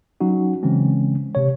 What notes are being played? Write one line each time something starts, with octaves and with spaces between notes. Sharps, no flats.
F#3 C#4 D#4 F#4
C#3 E3 G#3 C4 C#4
C3 C#5